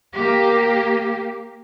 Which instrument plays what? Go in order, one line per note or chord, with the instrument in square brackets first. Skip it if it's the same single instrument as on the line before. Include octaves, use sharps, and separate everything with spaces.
[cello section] A#3 G4